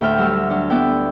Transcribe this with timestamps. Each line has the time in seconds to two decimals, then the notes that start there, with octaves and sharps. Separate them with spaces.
0.01 D2 A2 A4 E5 G5 F6
0.18 F#3 G3 E6
0.50 F#3 D4
0.70 B3 E4 B4 D5 G5 E6